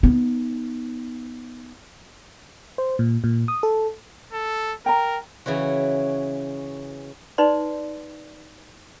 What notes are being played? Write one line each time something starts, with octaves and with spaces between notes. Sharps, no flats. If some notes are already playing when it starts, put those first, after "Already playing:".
B3 D#4
C5
A#2
A#2
D#6
A4
A4
A#4 G5 A#5
C#3 E3 C#4 F#4
D#4 B4 D5 C6